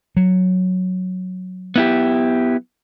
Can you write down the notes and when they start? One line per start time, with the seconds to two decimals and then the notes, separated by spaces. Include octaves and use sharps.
0.17 F#3
1.76 B3 E4 G4